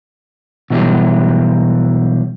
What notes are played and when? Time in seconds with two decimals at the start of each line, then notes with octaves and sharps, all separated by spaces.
0.70 B2 E3 F#3 G3